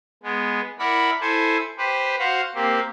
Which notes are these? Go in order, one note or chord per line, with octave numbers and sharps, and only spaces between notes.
G#3 B3
E4 A#4 D5 F#5 B5
E4 A4 C5 G#5
G4 B4 C5
F#4 C5 F5 F#5
A#3 C4 G4